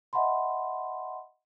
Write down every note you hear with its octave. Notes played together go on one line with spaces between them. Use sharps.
D#5 E5 F#5 A5 B5 C6